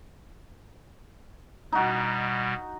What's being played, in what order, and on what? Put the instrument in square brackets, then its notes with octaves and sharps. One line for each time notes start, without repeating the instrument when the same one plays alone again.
[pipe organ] B2 G3 [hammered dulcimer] D#4 F#4